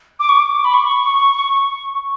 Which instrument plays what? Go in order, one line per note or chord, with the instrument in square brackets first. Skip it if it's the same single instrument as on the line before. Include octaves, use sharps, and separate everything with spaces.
[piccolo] D6
C#6
D6
B5
C#6